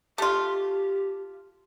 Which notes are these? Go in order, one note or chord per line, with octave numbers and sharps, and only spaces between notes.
A3 F4 G4